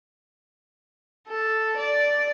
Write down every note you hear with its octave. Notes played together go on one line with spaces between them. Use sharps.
A4
D5